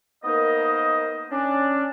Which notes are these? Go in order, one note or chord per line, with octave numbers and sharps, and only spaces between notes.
A#3 B3 D#4 A#4 C5 D#5
C#4 D4